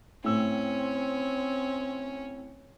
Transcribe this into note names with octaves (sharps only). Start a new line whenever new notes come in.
A2 C4 C#4 E6